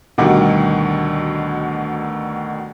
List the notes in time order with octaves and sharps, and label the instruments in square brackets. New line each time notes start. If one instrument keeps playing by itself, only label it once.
[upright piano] D2 B2 D3 D#3 G3